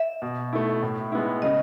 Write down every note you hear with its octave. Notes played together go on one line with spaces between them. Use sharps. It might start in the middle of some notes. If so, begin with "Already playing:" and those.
Already playing: E5
B2
A3 E4
A2
G#3 B3 E4
C#3 D#5